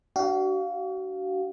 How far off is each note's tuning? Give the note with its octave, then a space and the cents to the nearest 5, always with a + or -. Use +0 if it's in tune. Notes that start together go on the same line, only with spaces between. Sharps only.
D4 +0 F#4 +35 F5 +0